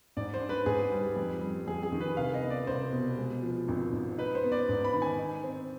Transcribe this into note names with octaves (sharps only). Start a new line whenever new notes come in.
G#2 D5
C5
D4
B4
G#2 G#4
G3
F2
G3
F2 G#4
G#4
D#3
B4
C2 F5
D#5
B3
D5
C2 C5
B2
G#3
F3
G#1
G#2
D#4 B4
C5
B3
D5
G#2
B5
D#3
G#5
D#4
C4